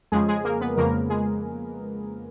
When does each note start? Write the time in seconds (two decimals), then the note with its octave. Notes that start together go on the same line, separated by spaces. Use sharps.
0.12 F2 C#3 F3 G#3 G#4
0.28 G#3 G#4
0.44 A#3 A#4
0.61 B3 B4
0.77 F2 C#3 F3 A#3 A#4
1.10 G#3 G#4